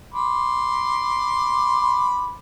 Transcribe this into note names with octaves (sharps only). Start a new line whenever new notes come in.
B5 C6 D6